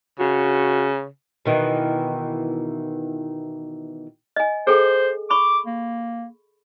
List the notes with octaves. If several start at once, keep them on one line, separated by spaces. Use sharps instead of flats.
C#3 F#4
B2 D#3 E3
D#5 G#5
G#4 A4 C5 G5
B5 C#6 D6
A#3